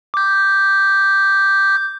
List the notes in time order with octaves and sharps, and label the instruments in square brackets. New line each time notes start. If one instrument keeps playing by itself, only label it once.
[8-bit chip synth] D6 G6